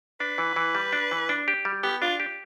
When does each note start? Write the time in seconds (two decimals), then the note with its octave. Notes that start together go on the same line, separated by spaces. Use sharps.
0.20 D4 B4
0.38 E3
0.56 E3
0.75 G3
0.93 D4
1.11 E3
1.29 D4
1.48 G4
1.65 G3
1.83 B3 G4
2.02 D4 F4
2.20 G4